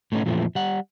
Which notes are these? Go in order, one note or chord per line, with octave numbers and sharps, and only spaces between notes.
A2 A3 B3 C#4 D#4
F2 A#2 E3 F3 A3
G3 F#5